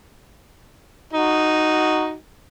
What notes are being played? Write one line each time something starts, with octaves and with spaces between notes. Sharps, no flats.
D#4 F#4